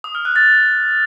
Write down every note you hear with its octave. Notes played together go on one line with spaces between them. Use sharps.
D#6
F6
F#6
A6